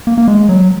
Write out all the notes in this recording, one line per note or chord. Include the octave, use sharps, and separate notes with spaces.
A#3
A#3
G#3
F#3